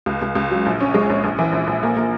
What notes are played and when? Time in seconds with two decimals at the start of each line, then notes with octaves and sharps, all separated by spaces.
0.06 C#2
0.22 C#2
0.35 C#2
0.51 F#3
0.66 A#1
0.80 C#4
0.94 G#3
1.10 A#1
1.24 A#1
1.39 E3
1.53 A#1
1.67 A#1
1.83 A#3
1.97 A#3